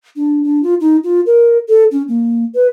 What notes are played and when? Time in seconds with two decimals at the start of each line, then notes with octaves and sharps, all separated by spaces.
0.16 D4
0.43 D4
0.63 F4
0.81 D#4
1.04 F4
1.26 A#4
1.69 A4
1.91 C#4
2.08 A#3
2.55 B4